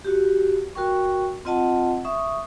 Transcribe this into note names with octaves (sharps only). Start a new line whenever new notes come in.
F#4 G4
F#4 A#4 G5 C#6
C4 F4 D#5 F#5 A5
E5 C#6 D#6